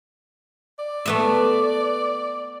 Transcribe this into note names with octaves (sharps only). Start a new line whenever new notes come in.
D5
A3 B3 E5